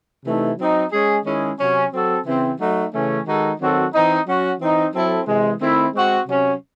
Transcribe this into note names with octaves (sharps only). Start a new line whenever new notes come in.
C3 E3 A3 D#4
F#3 C4 D#4
G#3 C#4 G#4
D#3 G#3 C#4 E4 G#4
C3 F#3 C#4
F#3 C4 F#4 A4
C#3 E3 C4
F#3 A3 D#4 F#4
C#3 E3 A3 C#4
D#3 G#3 D#4 F#4 A4
D#3 F#3 C4 F#4 A4
E3 C4 D#4
F#3 C#4 F#4
E3 C4 D#4
F#3 C4 E4 A4
C3 E3 G#3
D#3 A3 C4 E4
G#3 C4 F#4
C3 F#3 C#4